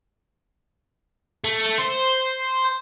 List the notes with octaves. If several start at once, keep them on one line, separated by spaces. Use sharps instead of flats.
A3
C5